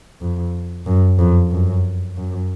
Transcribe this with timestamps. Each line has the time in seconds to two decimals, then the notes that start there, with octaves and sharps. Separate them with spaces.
0.21 F2
0.86 F#2
1.18 F2
1.51 F#2
2.16 F#2